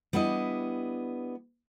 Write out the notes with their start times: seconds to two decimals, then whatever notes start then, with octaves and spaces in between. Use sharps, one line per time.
0.13 G3 B3 D4 E4 D#5